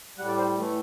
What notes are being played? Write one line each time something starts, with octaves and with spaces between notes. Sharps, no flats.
A2 G3 F#5
D5
C5
A2 E3 A3